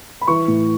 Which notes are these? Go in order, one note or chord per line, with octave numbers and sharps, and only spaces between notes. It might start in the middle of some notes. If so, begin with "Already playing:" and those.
B5
E3 C#6
A2